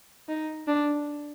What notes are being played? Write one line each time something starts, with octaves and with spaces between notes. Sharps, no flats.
D#4
D4